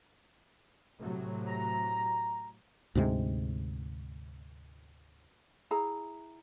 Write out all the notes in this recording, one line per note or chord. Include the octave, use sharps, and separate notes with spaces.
A2 C3 F#3
A#5
D2 G#2 C3 G#3
E4 G#4 A#5